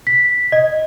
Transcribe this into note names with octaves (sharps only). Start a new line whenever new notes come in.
B6
D#5